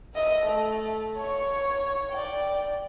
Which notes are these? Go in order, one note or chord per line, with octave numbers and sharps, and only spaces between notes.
D#5 E5
A3
C#5 C#6
D5 G5